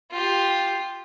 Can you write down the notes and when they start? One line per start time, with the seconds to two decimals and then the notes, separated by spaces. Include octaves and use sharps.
0.11 F4 G4